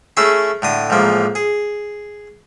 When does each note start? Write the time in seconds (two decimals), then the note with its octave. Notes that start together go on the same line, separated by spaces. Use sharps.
0.17 A3 C#4 E4 G#4 E5
0.62 A2 D3 D#6
0.90 A1 G#2 F3 A#3
1.35 G#4